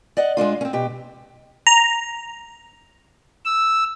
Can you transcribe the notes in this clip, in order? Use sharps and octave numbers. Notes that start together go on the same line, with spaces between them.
D5 D#5 F#5
G#3 A#3 D4 F4
C4 C#4
B2 G4
A#5
E6